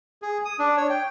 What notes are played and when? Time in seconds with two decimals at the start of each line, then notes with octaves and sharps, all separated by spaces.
0.22 G#4
0.45 D#6
0.59 D4
0.77 C#5
0.90 G5